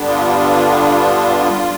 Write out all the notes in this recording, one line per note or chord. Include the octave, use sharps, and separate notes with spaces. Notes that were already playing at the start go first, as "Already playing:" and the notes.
Already playing: G2 D3 G3 B3 D4
F4